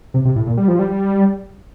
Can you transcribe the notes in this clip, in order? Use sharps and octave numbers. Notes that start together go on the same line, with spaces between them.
C3
C3
A2
A#2
G3
F3
G3